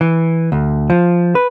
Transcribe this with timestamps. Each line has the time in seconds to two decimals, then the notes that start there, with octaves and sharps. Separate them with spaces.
0.01 E3
0.52 D2
0.90 F3
1.35 B4